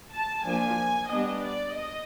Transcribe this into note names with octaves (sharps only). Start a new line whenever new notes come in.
A5
F3 A#3 D4 G#5
G3 B3 D4 D#5
D5
D#5